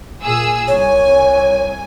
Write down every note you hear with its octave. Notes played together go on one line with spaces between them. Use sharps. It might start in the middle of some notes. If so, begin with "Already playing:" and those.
A#2 G#4 E6
C2 C#5 G#5